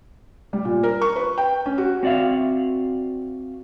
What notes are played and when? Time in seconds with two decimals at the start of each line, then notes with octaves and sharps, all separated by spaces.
0.53 G3
0.65 A#2
0.83 A#4
1.01 C#6
1.16 B4
1.38 G5
1.66 C#4
1.78 F#4
2.03 C4 F#4 D5 E5 F5